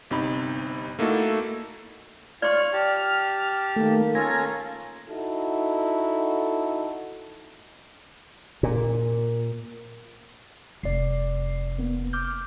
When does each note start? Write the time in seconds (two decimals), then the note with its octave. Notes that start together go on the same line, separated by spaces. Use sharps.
0.10 G1 C3 D#4 B5
0.99 A3 A#3 D#4 E4 F#4 A4
2.42 F4 C#5 D5 C6 C#6 F6
2.73 G4 A5
3.76 D#3 A3 A#3
4.15 C#4 F4 A4 G#5 A#5
5.09 D#4 E4 F#4 A4
8.63 A#2
10.83 F1 D5 C7
11.78 A#3 B3
12.13 D6 F6 G6